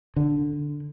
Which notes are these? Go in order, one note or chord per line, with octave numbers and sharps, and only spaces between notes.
D3